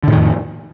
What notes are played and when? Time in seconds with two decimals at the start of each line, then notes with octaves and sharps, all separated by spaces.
0.03 D3
0.08 A2
0.12 D#3
0.17 F2